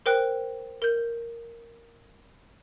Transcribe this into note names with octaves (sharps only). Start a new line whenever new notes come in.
A#4 C5 G5 F#6
A#4 G6